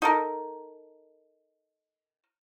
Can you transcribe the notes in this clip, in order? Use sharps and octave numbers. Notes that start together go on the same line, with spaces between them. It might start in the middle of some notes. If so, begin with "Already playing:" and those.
D#4 A4 A#4